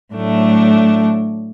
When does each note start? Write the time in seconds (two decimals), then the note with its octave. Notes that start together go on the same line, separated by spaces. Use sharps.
0.14 A2 F#3 A3 D4